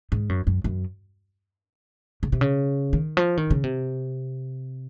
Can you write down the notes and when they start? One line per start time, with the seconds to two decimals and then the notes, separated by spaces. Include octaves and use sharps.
0.12 G#2
0.29 F#2
0.47 F#2
0.64 F#2
2.23 C#3
2.32 C3
2.41 C#3
2.93 D#3
3.17 F3
3.37 D#3
3.50 C#3
3.64 C3